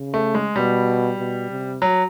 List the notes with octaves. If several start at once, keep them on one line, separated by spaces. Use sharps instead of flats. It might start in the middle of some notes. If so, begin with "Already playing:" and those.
Already playing: C#3
A3
G#3
B2 G3
B2
C3
F#3